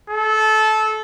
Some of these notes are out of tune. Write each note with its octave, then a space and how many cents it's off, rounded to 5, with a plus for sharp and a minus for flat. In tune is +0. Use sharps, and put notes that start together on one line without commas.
A4 -20